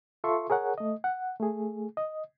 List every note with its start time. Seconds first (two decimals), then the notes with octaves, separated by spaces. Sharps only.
0.24 F4 A4 E5 C6 C#6
0.50 G#4 A#4 C#5 F#5
0.78 A3 D#5
1.04 F#5
1.40 A3 G#4
1.97 D#5